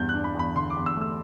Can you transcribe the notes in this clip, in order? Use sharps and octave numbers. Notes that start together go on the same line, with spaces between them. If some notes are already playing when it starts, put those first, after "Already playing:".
Already playing: E2 G2 G6
D4 F#6
B5
E2 B5
D3 C6
D6
E2
E6
A3 E6